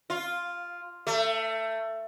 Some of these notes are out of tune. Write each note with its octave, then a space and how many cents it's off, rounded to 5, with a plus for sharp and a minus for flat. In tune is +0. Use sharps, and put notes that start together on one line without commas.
F4 +0
A3 +20